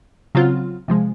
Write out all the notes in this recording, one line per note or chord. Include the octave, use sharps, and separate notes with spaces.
C#3 F#3 C4 F4
C3 F3 G#3